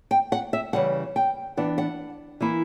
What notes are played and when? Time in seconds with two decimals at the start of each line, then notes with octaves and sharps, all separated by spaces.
0.11 G5
0.32 F#5
0.53 E5
0.73 C#3 E3 G3 F#5
1.16 G5
1.57 E3 B3 D4 F#5
1.78 F#5
2.41 E3 A#3 E4